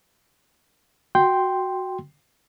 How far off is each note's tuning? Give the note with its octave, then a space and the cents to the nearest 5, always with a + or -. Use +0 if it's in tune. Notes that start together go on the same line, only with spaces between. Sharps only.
F#4 +0 G5 +0 C6 +0